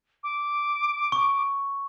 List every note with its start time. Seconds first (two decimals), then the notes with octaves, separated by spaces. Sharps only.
0.23 D6
1.12 C#6